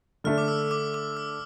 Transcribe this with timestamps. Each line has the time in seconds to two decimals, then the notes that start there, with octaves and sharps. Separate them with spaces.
0.24 D3 A3 D4 F6
0.38 D6
0.48 E6
0.71 D6
0.94 D6
1.17 E6